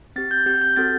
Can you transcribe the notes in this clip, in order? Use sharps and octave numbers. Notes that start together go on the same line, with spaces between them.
C4 G4 A6
G6
C4 G4 G6
G6
C4 F#4 A4 A6